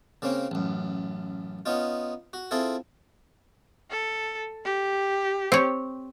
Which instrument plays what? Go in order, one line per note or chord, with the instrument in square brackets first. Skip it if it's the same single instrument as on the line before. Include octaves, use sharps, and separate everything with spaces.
[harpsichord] C#3 A#3 C4 C#4
A1 F#2
B3 C#4 D#4 F4
F#4
C4 E4 F4 G#4 A4
[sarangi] A4
G4
[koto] C4 C#5